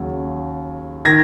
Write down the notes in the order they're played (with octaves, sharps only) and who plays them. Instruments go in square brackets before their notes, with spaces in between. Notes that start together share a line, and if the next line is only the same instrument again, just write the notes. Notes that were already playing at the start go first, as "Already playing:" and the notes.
Already playing: [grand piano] D#2 C#3 F#3
D#3 G#6 A#6